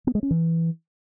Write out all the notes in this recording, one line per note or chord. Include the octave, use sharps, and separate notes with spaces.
B3
G#3
C#4
E3